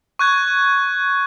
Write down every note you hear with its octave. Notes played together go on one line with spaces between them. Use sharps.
C#6 F#6 G#6